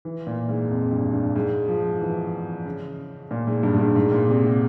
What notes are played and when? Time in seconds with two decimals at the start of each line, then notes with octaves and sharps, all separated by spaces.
0.05 E3
0.27 A#2
0.49 G#2
0.70 F2
0.91 G2
1.13 G2
1.36 G#2
1.68 F3
2.01 E3
2.66 C#3
3.31 A#2
3.47 G#2
3.63 G2
3.74 G#2
3.79 G2
3.96 G#2
4.11 A#2
4.29 C3
4.45 C3